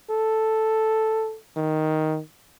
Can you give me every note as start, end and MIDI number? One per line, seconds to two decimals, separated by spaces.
0.10 1.36 69
1.56 2.19 51